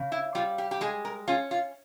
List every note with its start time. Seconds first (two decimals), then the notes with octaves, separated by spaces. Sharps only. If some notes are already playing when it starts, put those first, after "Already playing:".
Already playing: C#3
0.12 E4
0.35 G3 F4
0.58 G4
0.71 G4
0.81 G#3 G#4
1.05 A#4
1.28 C#4 F4
1.51 F4